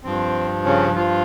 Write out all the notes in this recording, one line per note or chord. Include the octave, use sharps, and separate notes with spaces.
G2 F3 C4
C#3 C#4
F3 F4